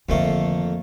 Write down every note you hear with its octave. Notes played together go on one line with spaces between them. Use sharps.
F2 D3 D#3 A3 A#3